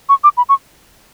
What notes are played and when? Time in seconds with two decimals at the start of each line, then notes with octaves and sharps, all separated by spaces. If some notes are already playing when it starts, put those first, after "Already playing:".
0.09 C#6
0.24 D6
0.37 B5
0.49 C#6